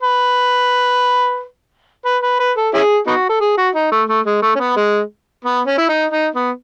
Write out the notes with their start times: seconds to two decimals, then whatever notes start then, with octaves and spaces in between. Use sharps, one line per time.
0.02 B4
2.05 B4
2.23 B4
2.39 B4
2.57 A4
2.74 C#4 E4 G#4
3.07 B3 D#4 F#4
3.29 A4
3.41 G#4
3.57 F#4
3.75 D#4
3.92 A3
4.08 A3
4.25 G#3
4.42 A3
4.55 C#4
4.60 B3
4.76 G#3
5.45 B3
5.67 C#4
5.78 E4
5.89 D#4
6.11 D#4
6.35 B3